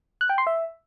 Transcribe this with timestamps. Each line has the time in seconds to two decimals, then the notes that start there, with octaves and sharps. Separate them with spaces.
0.21 F#6
0.29 G5
0.38 C6
0.47 E5